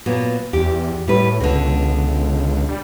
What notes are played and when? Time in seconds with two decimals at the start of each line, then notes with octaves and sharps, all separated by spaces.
0.06 A#2 F#3 B3
0.53 E2 G4
1.08 A2 G3 B4
1.40 C#2 B2 D3
2.69 G3